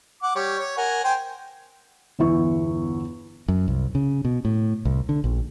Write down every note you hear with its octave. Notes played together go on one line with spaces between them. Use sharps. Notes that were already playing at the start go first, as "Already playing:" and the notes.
F#5 D6
G3 C#5
C#5
A#4 F#5 G#5
C5 G5 G#5
G1 E2 E4 C#6
F#2
C2
C#3
B2
A2
C2
D3
A#1